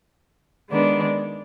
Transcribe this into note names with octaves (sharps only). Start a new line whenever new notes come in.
D#3 G#3 B3 D4